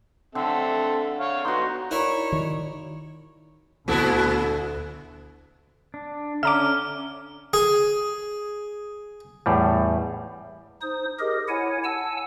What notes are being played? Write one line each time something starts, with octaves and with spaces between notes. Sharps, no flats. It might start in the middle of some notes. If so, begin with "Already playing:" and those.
D3 C4 A4 E5
C#5 F5
B3 D#4 F#4 C6
D#4 E4 F#4 A#4 C#5 D5
D#3
D2 A#2 E4 A4
D4
D3 C#4 E5 A#5 D6 F6
G#4
E2 A2 G3
D#4 C5 D#6
G4 G#4 A#4 D#5
E4 C#5 F#5 G#5
F#5 G#5 A5 E6